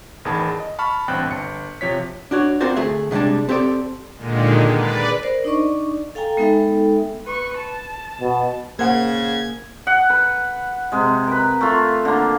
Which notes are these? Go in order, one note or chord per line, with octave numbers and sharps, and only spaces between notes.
A1 E2 D#3 G#4 A5 B5
D#5
A5 B5 C#6 F6
A1 G2 C4 G5 A5 F#6
G1 C#7
C3 F3 C#5 B6
D4 F#4 C#5
C4 F4 F#4 A#4 C5 D5
D2 A3 G#4 E5
C3 D#3 G3 G#3 D4
C4 G4 A4 C5 D5
A#2 D3 D#3 G#3
B4 D5
A#4 C5 D5
D4 D#4 D5 D#5 C#6
A4 F5 G5 G#5 A#5
G#3 B3 D#4 A4 E5 G5
B4 C#6
A5
B2
C#3 A#3 C5 F#5 G#6
F#5
B4
C3 G#3
A#4 B4
A3 F4
D3 A#3